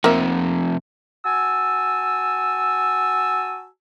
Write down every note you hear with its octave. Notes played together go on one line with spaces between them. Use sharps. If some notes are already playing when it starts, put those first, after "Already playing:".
C3 F3 A#3 E5
F#4 G#5 A5 E6